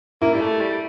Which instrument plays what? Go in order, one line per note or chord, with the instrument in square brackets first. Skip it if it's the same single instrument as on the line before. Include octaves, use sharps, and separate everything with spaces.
[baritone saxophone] A#3 [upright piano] E4
[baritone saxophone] G3
A3
G3